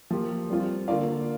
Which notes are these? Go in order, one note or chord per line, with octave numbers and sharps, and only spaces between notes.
F3 A#3 G4
G3 C4 F4
D3 A#3 F4 D5 F5